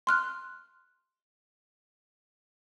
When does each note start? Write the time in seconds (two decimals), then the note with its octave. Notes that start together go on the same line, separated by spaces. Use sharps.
0.07 C6 F6 F#6